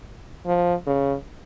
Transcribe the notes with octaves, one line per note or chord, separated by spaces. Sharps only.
F3
C#3